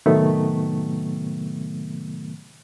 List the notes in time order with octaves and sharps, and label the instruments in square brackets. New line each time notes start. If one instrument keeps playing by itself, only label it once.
[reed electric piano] A2 C3 D#3 F#3 A3 B3